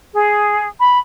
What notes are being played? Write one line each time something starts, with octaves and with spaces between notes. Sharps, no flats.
G#4
B5